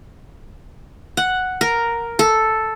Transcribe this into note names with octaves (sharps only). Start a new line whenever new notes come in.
F#5
A#4
A4